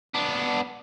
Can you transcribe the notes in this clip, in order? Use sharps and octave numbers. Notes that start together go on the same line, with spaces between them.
B3 D4